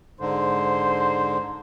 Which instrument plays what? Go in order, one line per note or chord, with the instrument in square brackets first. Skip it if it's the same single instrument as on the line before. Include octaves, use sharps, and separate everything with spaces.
[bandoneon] G#2 D3 [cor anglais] C5